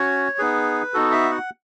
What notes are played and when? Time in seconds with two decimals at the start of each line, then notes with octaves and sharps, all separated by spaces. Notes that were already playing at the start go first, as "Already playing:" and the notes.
Already playing: C#4 F#4 C#5
0.38 B3 D#4 G#4 B4
0.94 B3 D#4 F#4 A4
1.12 E5
1.31 F#5